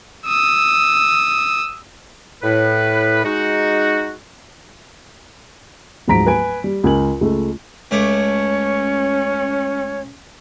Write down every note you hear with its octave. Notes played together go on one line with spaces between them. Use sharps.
D#6 E6
A2 B4
G#3 D#4 F#4
D1 G#2 F3 A#5 B6 D7
B4 G#5 D7
G3
C#2 A#4 G#5 F#7
C#2 G#3 A3
C#2 A3 C#4 C#5 D6